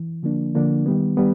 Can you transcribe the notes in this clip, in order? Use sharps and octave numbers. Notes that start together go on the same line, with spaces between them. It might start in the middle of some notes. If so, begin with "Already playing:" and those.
Already playing: E3
D3 F3 A#3 D4
D3 F3 A#3 D4
D#3 G3 B3
G3 B3